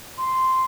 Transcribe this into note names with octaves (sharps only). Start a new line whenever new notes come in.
C6